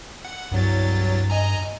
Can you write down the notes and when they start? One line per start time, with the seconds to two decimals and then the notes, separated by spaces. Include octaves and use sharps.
0.25 F#5
0.52 C2 G2 F#3 A6
1.30 D#5 G#5 A#5